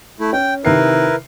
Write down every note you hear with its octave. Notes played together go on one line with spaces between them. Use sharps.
A3 E4
C#4 G5
C3 D#3 E4 A#4 B4 C7